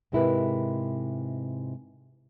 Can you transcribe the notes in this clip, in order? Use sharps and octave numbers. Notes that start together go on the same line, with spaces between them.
G#2 C3 G#3 E4 A#4 B4